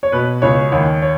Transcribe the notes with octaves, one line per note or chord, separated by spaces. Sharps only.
C#5
B2 B4
C#2 C#5
D#2 C#5
C#5